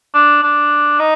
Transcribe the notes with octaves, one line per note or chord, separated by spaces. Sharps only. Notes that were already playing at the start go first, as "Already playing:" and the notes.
D4
D4
D#4